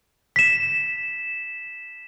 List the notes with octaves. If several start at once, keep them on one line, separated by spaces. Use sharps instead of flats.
B6 E7